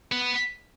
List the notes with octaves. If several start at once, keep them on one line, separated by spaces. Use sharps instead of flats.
B3